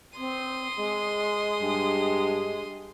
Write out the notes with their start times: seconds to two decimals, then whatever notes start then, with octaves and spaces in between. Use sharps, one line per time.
0.17 C4 C6 D#6
0.77 G#3
1.62 G2